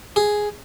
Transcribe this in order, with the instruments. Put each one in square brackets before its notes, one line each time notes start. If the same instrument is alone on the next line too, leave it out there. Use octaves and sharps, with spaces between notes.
[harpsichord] G#4